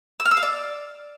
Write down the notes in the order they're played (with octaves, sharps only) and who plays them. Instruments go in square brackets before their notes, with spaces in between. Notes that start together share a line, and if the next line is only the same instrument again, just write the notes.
[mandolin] E6
F6
E6
F5
D5